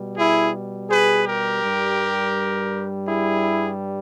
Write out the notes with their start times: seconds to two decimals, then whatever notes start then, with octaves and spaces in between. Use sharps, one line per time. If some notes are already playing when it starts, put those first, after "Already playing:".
Already playing: B2 G3
0.18 E4 G#4
0.90 G#4 B4
1.26 G4 A#4
1.62 G2 G3
3.06 E4 G#4